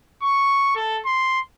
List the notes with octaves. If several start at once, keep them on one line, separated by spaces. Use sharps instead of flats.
C#6
A4
C6